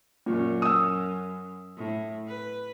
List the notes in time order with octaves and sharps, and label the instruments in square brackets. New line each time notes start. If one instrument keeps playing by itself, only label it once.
[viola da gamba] F#2 [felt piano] A#2
[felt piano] D#6 E6
[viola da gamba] A2
B4